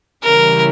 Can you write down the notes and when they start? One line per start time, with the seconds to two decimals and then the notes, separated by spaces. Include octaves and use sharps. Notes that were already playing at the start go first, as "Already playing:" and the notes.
0.23 C#3 E3 G3 C#4 E4 A#4